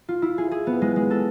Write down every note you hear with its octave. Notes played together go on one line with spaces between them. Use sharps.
F4
E4
G#4
G#4
B3
G#3
G#3
A4